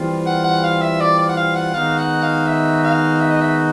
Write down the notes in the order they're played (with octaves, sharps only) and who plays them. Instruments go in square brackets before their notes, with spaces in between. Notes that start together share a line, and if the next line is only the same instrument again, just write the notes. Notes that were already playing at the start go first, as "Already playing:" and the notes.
Already playing: [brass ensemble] E3 G3 C4 F4
[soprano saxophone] F#5
F#5
F5
E5
D5
D5
F#5
F5
F#5
[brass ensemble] D#3 G#3 B3 D#4 F#4 [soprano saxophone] F5
[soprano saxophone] F#5
F5
E5
F5
E5
D#5
E5